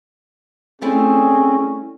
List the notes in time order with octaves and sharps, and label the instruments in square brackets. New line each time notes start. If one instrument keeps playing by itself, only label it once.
[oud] G3 A3 E4 [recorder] C4 [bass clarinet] C#4 [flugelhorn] G#4